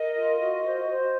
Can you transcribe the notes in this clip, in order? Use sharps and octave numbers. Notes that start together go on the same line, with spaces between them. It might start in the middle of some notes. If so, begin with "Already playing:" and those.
Already playing: A#4 D#5
F4
F#4
C5
C5